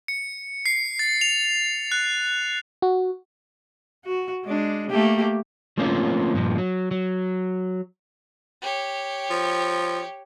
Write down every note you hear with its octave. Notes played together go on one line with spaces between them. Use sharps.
C#7
C7
A6
F7
F#6
F#4
F#4
G#3 D4
A3 A#3 G4
F3 A3 A#3 C4 C#4 F4
G2 A#2 F3
F#3
F#3
G4 C#5
F3